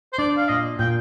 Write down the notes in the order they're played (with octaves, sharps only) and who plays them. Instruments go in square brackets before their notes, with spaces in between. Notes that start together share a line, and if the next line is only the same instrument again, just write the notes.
[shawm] C5
[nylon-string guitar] D4 [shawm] D5
[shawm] F5
[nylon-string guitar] A#2 [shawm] D#5
[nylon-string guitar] A#2 [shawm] G5